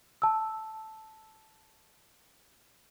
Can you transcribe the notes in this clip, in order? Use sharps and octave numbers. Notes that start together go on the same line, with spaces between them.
A5 E6